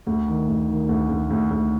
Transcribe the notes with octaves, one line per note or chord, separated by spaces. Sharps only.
D2
D#3
D2
D#3
D2
D2
D2
D2